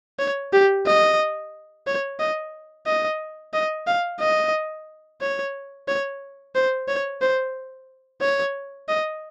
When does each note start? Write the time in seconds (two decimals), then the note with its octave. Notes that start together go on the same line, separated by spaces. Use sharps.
0.19 C#5
0.53 G4
0.86 D#5
1.87 C#5
2.20 D#5
2.87 D#5
3.54 D#5
3.87 F5
4.21 D#5
5.21 C#5
5.88 C#5
6.55 C5
6.88 C#5
7.21 C5
8.22 C#5
8.88 D#5